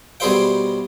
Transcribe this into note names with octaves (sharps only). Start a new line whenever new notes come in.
B2 G3 G#4 C5 E5 G5